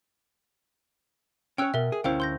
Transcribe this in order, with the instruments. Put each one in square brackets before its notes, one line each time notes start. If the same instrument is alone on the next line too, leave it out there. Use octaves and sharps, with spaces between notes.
[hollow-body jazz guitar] C#4 C#5 [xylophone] G5 E6 F#6
[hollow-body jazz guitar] B2 [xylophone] A#4 E5
[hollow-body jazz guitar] G#4
[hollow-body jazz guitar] D2 C#4 E4 [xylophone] C5 F5 G5
[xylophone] C6 G6 A#6